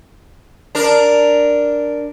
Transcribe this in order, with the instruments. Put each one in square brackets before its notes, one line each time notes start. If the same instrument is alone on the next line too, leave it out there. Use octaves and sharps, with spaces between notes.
[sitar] D4 A#4